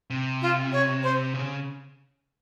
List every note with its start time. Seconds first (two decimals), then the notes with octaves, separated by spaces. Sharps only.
0.10 C3
0.42 F4
0.72 C#5
1.03 C5
1.34 C#3